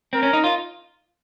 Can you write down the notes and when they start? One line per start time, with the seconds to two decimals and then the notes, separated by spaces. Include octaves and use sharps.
0.13 C4 A#4
0.23 C#4
0.33 D#4
0.44 F4